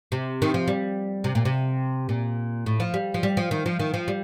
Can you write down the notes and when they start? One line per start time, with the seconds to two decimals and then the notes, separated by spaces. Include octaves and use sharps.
0.12 C3
0.42 D#3
0.54 F3
0.68 G3
1.24 C3
1.35 A#2
1.45 C3
2.09 A#2
2.66 A2
2.80 F3
2.94 G3
3.14 F3
3.23 G3
3.37 F3
3.51 D#3
3.66 F3
3.79 D#3
3.94 F3
4.08 G3